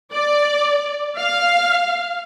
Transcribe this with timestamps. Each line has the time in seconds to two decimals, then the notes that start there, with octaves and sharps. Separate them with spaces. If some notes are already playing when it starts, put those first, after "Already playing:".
0.13 D5
1.19 F5